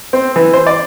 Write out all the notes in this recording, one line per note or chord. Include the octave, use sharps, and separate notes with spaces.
C4
E3
C5
D5